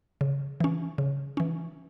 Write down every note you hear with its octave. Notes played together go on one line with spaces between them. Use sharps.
C#3
E3 C#4
C#3
E3 C#4